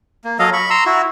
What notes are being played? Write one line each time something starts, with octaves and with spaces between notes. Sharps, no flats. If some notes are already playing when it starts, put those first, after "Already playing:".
A#3
F#3 A4 D#5 F5
B5 C#6
A#5 C6 E6
E4 F#4